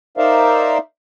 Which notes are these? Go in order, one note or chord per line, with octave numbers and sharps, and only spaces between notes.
D#4 A#4 C5 D5 E5 F5